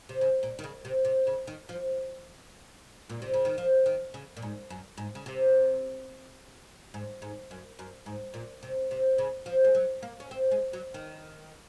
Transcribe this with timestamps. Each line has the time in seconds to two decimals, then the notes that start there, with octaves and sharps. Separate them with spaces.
0.09 C3
0.21 C#3
0.43 A#2
0.59 D#3
0.64 C#3
0.85 C3
1.05 C3
1.27 C#3
1.47 D#3
1.69 F3
3.09 A#2
3.22 C3
3.34 C#3
3.45 D#3
3.58 F3
3.86 D#3
4.14 C#3
4.37 A#2
4.42 G#2
4.70 F#2
4.98 G#2
5.15 C#3
5.26 C3
6.94 G#2
7.22 G#2
7.51 F#2
7.79 F#2
8.06 G#2
8.34 A#2
8.63 C3
8.91 C3
9.18 C#3
9.46 F3
9.64 G#3
9.75 F#3
10.02 A#3
10.20 C#4
10.31 C4
10.51 G#3
10.73 F#3
10.94 D#3